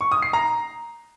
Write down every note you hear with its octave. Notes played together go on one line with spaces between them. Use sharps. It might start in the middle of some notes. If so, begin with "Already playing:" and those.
C#6
D#6
C7
A#5